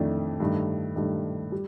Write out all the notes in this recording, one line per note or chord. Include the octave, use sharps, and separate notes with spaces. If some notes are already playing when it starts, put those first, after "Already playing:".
Already playing: F2 D#3 A3 D4
G2 D#3 A3
G2 D#3 A3
G3